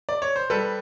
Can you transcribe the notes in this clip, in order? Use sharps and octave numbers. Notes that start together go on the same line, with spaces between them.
D5
C#5
C5
G3 A4 B4